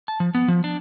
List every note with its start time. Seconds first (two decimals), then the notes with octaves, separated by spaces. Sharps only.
0.08 A5
0.20 F3
0.35 B3
0.48 F3
0.64 D4